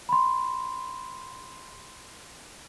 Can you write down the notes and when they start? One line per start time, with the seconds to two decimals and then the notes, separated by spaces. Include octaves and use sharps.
0.09 B5 C6